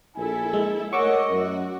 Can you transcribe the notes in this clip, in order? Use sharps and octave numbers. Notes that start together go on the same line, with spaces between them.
A#1 E4 A4 G#5
G#3
A3 A#4 C#5 D#5 F#5 C#6 D6 E6
F#2 F#4